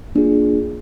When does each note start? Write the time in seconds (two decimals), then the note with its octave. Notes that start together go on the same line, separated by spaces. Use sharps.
0.15 A#3 D4 F4 G#4